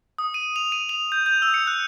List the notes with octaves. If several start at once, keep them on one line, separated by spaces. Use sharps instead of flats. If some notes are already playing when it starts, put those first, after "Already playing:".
D#6
D#7
F7
D#7
F7
G6
G6
E6
C#7
F#6